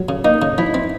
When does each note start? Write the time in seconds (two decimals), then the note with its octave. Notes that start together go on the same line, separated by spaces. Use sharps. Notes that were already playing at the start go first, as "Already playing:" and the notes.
Already playing: F#3
0.09 C#3
0.24 A#3 D#4
0.42 C#3
0.58 F3 E4
0.74 C4